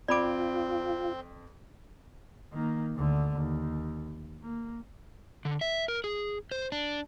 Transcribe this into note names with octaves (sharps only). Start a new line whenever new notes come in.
F2 C4 F4 D5 B5 D6 D7
D#3 A#3
D2 D3
D#2
A#3
D3
E5
A#4
G#4
C5
D4